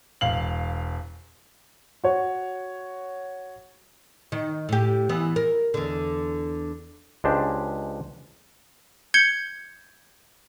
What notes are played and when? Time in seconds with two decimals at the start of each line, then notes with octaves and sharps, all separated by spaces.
0.21 E1 F5 F#7
2.04 F#4 C#5
4.32 D#3
4.69 A2 G4
5.09 E3 B3
5.36 A#4
5.74 E2 D3
7.24 C#2 G#3 D4 G4 C5
9.14 G6 G#6 C#7 G7